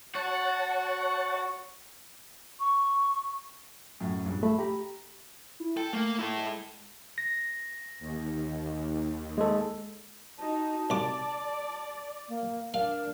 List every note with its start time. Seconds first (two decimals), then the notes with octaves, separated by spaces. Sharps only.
0.15 F#4 C#5 F#5 A5
2.60 C#6
4.00 F#2 A2
4.25 A#1 G2
4.43 A3 E5 B5
4.59 G4 A#5 B5
5.60 E4
5.77 A4 G5
5.93 A3 A#3
6.19 E4 A4
6.37 G#3
7.18 A#6
7.99 D#2
9.38 G#3 A4
10.38 D#4 F#4 A5
10.90 C2 D5 D6
12.28 A#3
12.74 D4 A#4 F5